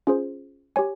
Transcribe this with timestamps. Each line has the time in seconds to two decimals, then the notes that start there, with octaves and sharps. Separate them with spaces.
0.07 C#4 F4 G#4 C5
0.76 G4 C#5 G#5